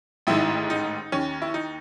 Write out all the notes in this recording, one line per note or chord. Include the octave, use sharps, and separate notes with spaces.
A1 G#2 D#3 E4
D#4
D#2 D#3 C#4
E4
D#4